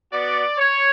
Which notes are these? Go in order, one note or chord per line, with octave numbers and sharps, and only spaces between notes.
B3 F#4 D5
C#5